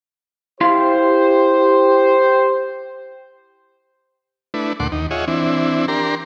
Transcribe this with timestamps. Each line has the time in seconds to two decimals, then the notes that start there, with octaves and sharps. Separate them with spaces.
0.61 E4 G4 C5 F5 C6
4.54 A3 D4 E4 B4
4.80 D2 A#2 A3 F#5 C6 D6
4.92 D#2 D#4
5.11 F4 G#4 C#5 D#5 E5 F#5
5.28 E3 C4 D4 E4
5.88 D4 G4 A#4 A#5 C6